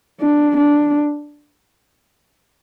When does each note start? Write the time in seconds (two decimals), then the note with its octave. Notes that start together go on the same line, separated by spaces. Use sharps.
0.21 D4
0.57 D4